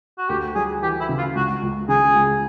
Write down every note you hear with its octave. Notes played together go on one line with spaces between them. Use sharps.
F#4
D2 G4
G3 G#4
E3 G4
E4
C#3
F4
C#2 F#4
C#2
C#3 G#4
C#2